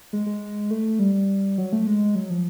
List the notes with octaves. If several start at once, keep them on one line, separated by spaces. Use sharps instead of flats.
G#3
G#3
A3
G3
F#3
A3
G#3
F#3
F3